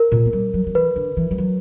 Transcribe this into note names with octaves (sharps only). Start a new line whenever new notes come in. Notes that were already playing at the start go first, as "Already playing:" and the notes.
Already playing: A#4
A#2
A#3
G3
F#3
F#3
E3 B4
D3
E3
G3
F#3